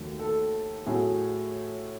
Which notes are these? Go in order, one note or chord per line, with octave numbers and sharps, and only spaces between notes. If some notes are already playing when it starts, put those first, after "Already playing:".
Already playing: D#2 D#3 F#3 A3
A4
A2 F#3 A3 G#4